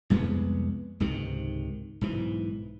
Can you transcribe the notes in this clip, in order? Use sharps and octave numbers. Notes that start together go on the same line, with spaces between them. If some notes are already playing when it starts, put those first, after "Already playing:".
C2 F2 G#3 B3
C#2 G#2 C3 D#3
B1 G#2 E3